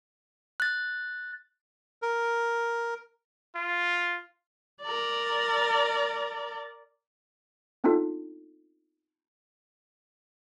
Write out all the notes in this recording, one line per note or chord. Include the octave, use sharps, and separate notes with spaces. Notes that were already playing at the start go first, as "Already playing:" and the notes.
F#6 A6
A#4
F4
A#4 D5
B3 C4 D4 D#4 F4 A4